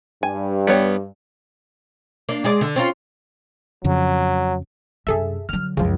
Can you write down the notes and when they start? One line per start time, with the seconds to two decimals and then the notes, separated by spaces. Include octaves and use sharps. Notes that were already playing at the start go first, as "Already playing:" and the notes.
0.23 G2 G#5
0.67 G3 B3 C#5
2.29 A#3 D4
2.44 G#3 G#4 D5
2.61 D3
2.76 C4 C#4 F4
3.84 F2 C#3 F#3
5.07 F#2 C3 G#4 A4 E5
5.49 D3 F#3 F6
5.77 C#2 F#2 C#3 F3